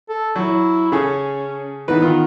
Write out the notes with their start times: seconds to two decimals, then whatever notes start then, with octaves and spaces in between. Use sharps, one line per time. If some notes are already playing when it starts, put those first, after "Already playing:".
0.09 A4
0.36 F#3 E4
0.92 C#3 C#4 G#4 A4
1.88 G#2 E3 B3 B4
2.02 D#3 F4